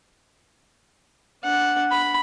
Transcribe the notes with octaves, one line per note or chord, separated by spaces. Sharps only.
D4 F#5
B5